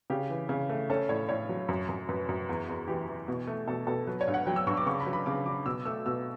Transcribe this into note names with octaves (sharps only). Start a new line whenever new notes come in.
C#3 G4
E3
C#3
A3
C#4 A4
A2 C#5
A2 C#5
F#3
F#2
F#2
F#2 B4
F#2
E2
E2
E3 G4
E3
B2
A3
B2 A4
B2 A4
F#3 B4
C#5
G2
F#5
F#3 G5
E6
G2 C#6
D6
C#3 C#6
B5
F#3
B5
C#3 D6
F#3 D6
B2 E6
A3 E6
B2 E6